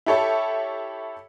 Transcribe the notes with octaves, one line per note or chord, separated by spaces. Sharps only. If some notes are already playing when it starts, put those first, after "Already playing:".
E4 G4 A4 C#5 E5